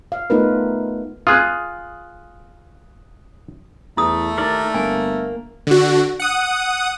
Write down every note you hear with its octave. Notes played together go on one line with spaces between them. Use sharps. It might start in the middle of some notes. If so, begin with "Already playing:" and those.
F5
A3 B3 D#4 F4 A#4 B4
F4 G#4 D#6 F#6
E2 A3 E4 D#6
D#2 A#4 D5
G1 A#3 G#5
D3 F#4
F#5 D#6